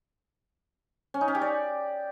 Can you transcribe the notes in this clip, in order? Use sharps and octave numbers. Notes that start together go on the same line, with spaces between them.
C#4
D#4
C#4
G4
D5